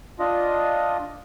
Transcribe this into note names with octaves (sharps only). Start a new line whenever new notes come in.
D4 F4 D#5